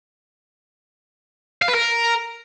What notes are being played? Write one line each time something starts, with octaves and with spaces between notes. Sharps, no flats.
F5
B4
A#4